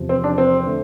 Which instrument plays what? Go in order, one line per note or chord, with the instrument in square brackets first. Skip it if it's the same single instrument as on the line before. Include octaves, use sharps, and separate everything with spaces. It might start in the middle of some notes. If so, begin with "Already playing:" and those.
Already playing: [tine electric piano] E2 C3 F3
[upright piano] C4
D4
C4
[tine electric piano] D3 A3